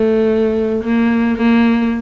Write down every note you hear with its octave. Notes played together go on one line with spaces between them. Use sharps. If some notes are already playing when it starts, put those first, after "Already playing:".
Already playing: A3
A#3
A#3